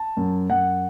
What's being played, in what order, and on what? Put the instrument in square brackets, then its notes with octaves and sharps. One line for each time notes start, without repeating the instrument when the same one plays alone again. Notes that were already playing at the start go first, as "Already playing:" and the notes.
Already playing: [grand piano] A5
F#2
F#2 F#5